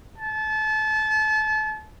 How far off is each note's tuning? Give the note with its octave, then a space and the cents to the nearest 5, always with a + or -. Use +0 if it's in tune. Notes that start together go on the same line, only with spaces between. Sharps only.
A5 -30